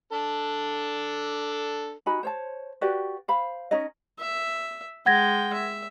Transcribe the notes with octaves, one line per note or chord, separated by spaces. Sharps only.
D4 A4
D#4 F#4 G#5 B5
C5 C#5 A5
F#4 G4 B4 D5
C5 F5 B5
C#4 D#4 C#5 D#5
E5
G#3 F#5 G5 G#6 A#6
E5